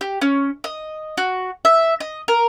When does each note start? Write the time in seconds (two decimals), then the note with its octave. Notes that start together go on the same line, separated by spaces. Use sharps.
0.01 G4
0.22 C#4
0.64 D#5
1.17 F#4
1.65 E5
2.00 D#5
2.28 A#4